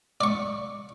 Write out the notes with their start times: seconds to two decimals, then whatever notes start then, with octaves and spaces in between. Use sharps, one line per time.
0.21 D5 C#6